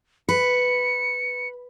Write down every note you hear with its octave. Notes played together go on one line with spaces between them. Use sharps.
B4 C#7